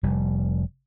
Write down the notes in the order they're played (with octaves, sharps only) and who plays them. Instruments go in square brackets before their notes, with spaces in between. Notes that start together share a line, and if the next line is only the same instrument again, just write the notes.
[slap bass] F1 G3